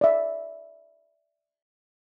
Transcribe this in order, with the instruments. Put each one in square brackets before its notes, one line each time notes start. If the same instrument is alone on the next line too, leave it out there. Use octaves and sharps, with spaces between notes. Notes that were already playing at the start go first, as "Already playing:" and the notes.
[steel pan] D5 E5